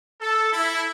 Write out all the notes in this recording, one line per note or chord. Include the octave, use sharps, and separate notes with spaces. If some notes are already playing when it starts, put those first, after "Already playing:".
A4
E4